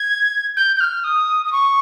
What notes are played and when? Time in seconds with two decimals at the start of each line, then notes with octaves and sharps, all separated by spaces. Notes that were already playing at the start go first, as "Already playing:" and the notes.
Already playing: G#6
0.57 G6
0.76 G6
0.80 F6
1.04 D#6
1.46 D#6
1.52 C#6